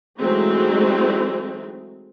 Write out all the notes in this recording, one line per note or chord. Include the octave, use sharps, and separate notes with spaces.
E3 F#3 G#3 A3 C4 D#4